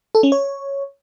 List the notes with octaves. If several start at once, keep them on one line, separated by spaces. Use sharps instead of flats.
A4
C#4
C#5